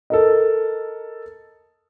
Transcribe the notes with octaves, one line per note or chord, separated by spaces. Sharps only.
A4 A#4 D#5